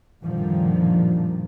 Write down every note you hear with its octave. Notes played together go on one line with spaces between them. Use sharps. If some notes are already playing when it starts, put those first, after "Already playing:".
F#2 A#2 D3 D#3 F3 G3